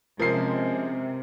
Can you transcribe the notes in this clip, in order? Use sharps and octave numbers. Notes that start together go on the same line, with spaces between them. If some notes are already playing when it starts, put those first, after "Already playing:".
C3 F3 G#3 C#4 A#4 C5 C7